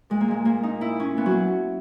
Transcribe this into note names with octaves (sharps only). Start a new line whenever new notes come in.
A#2 G#3
A#3
A#2 G#3
A#2 A#3
A#2 D#4
A#2 E4
A#2 C#4
A#2 B3
F#3